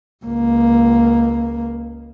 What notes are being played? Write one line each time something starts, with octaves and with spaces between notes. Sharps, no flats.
C#2 A#3